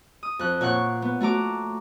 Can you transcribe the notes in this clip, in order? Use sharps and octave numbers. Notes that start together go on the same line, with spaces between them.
D#6
F2 F#6
A#2 C#5 F#5 C#6 F#6
B3
A3 F#4 A#5 D6